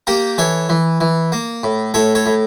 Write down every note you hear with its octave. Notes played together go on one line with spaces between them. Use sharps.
A#3 G4 A#4
E3 A4 C#5
E3
E3
A#3
A2
A2 A4 C#5
A4 C#5
A2